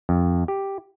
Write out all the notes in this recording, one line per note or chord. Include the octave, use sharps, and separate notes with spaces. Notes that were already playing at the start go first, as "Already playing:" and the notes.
F2
G4